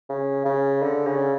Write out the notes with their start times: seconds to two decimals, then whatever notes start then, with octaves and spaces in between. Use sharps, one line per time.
0.09 C#3
0.45 C#3
0.82 D3
1.07 C#3